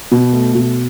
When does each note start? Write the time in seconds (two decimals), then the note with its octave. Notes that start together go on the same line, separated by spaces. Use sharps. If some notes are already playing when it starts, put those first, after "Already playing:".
0.12 B2
0.33 A3
0.55 B2